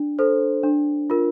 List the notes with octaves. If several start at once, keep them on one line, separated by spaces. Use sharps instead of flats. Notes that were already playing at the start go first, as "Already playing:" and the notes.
Already playing: D4
A4 C5
D4
F4 A#4